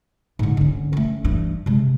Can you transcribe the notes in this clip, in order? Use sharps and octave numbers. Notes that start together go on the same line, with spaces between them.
G#2 D3
D3 C#4
A3 C#4
G2 E3
C3 G#3